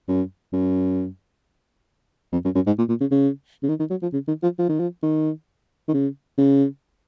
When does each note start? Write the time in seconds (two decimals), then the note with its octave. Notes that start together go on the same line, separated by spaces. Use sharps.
0.08 F#2
0.53 F#2
2.33 F2
2.45 F#2
2.55 F#2
2.67 G#2
2.78 A#2
2.89 A#2
3.01 C#3
3.11 C#3
3.63 C#3
3.69 D#3
3.80 D#3
3.90 F#3
4.02 F3
4.13 C#3
4.28 D#3
4.43 F3
4.59 F3
4.69 D#3
4.80 F3
5.03 D#3
5.88 D#3
5.94 C#3
6.38 C#3